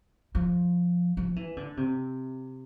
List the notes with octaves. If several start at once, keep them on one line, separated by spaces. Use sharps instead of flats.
F3
F3
E3
D3
C3